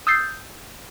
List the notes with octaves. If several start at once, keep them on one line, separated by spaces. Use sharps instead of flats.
D#6 E6 G6 A6 C7